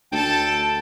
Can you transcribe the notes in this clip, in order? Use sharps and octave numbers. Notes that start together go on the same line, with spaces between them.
D2 A4 G5 A5